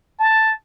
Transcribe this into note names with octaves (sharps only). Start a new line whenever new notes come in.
A5